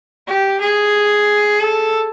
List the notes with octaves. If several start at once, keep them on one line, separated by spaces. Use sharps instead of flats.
G4
G#4
A4